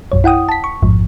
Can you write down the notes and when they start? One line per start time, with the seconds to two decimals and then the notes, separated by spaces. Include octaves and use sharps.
0.12 A#1 F#2 C#5
0.24 E4 F#5 G5 D#6
0.49 A5 B6
0.64 C#6
0.82 A1 F2 G#2 F3